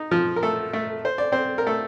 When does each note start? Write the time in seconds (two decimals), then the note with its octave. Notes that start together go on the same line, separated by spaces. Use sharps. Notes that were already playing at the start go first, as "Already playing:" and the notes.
Already playing: D#4
0.11 F3 F4
0.36 A#4
0.43 A3 A4
0.73 A3 A4
1.05 C5
1.18 D5
1.32 C4 C5
1.58 A#4
1.67 A3 A4